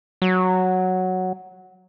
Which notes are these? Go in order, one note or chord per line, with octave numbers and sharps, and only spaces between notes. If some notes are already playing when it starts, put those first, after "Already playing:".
F#3